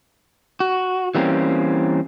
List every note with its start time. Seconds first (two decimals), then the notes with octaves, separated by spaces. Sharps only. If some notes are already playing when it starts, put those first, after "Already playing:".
0.60 F#4
1.15 E3 G3 A#3 C4 C#4